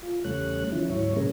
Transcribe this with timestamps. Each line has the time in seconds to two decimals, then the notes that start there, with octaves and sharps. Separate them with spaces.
0.03 F4
0.24 E2 C#3 G3 A3 C#5 F#6
0.72 D#3 F3 C#4 E4
0.90 D2 G#2 F#3 E4 C#5
1.16 A#2 C#3 G3 C#4 G#4 A#4